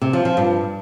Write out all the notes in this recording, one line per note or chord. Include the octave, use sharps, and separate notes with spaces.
C3
F3
F3
G2